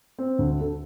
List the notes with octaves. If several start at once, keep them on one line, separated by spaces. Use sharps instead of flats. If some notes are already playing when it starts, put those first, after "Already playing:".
C4
D2
A4